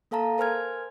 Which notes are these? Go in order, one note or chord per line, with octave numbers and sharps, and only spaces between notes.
A#3 A4 F5 A5 A#5
A#4 C5 G#5 F6 G#6